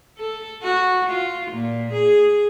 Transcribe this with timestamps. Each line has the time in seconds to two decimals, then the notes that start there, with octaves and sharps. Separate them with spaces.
0.18 A4
0.63 F#4
1.10 F4
1.51 A#2
1.93 G#4